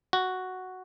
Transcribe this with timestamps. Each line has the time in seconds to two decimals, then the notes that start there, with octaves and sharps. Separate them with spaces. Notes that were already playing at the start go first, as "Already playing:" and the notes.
0.13 F#4